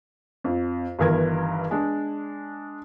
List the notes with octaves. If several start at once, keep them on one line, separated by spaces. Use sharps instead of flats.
F2
G1 G2 D#3 E3 A#4 G#6
G#3 D4